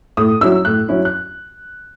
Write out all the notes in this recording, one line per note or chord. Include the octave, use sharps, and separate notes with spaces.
A2 D#6
F#3 C#4 E4 E6
A2 F#6
F#3 C#4 E4
F#6